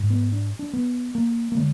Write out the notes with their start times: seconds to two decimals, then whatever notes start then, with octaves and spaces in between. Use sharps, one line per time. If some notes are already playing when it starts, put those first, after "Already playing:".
Already playing: G#2
0.10 B3
0.32 D4
0.59 D4
0.73 B3
1.15 A#3
1.52 A#3
1.56 D3 G#3